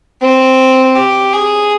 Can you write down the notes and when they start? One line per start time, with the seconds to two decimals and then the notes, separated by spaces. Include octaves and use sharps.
0.21 C4
0.95 G4
1.33 G#4